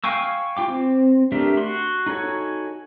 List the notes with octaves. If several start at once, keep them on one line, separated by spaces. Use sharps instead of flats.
F5 G5 G#5 C#6 E6
F4 G5 D6
C4
A3 D4 G4 A#4 E5
F#4 C6
D#4 F#4 A4 C#5 G#5